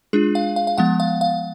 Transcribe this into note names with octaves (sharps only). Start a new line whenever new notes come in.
G#3 D4 F4 G#4
F5
F5
F5
F3 G#3 B3 F#5
F5
F5